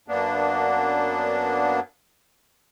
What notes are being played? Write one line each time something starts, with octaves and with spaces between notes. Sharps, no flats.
F#2 A#3 B3 D4